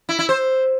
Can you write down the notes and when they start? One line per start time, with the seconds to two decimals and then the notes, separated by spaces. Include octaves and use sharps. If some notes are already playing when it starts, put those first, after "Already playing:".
0.09 E4
0.19 E4
0.29 C5